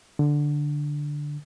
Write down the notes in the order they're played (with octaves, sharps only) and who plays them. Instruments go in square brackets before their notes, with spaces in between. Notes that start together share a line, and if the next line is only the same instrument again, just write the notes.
[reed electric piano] D3